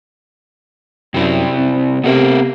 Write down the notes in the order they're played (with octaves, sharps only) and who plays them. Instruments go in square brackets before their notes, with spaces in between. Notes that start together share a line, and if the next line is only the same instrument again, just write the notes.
[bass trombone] F#2 [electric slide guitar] C3 E4
[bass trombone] C4
[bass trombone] C3 [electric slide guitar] B3 A4 A#4